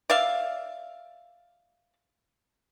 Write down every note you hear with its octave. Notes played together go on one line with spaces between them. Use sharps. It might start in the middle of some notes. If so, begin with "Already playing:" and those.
D5 E5 F5